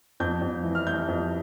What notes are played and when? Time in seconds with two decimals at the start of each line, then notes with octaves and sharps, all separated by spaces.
0.20 F2 G6
0.42 F2
0.64 E3
0.75 F6
0.87 E3 G6
1.08 F2